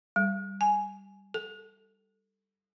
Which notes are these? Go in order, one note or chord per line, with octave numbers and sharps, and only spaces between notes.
G3
G#5
A4